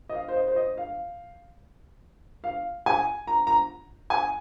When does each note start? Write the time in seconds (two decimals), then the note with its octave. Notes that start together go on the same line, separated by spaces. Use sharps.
0.09 D#5
0.15 F5
0.28 C5
0.36 D#5
0.48 C5
0.56 D#5
0.78 F5
2.44 F5
2.86 G#5
3.27 A#5
3.47 A#5
4.10 G#5